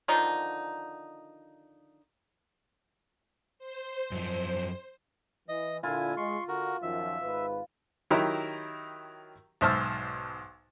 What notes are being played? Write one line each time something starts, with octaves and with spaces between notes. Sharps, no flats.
D3 D#3 F3 D#4
C5
F#2 F3
E3 D#5
A#2 D3 E4 F4 G#5
G#3 C6 C#6
D3 F#4 A#4
F#2 D#3 F3 E5
G#1 G#2 B4
D#3 F#3 D#4 E4 G4 A#4
B1 G#2 C5 E5 A5 F6